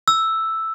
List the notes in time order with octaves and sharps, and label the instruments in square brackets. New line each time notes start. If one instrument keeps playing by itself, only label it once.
[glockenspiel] E6